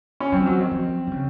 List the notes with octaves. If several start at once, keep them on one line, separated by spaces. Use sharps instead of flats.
C#4
F#3 C4
F3
F#3
D#3
F3
D#3
C#3